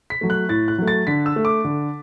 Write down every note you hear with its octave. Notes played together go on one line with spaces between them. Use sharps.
B6
F#3 A3
F#6
A2 A6
F#6
F#3 A3
A6
D3 B6
E6
A3
D6
D3